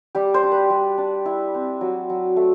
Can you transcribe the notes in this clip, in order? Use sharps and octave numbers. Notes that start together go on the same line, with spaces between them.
G3 G4
C5
D4
B4
G3
D4
E4
C4
F#3
F#3
A3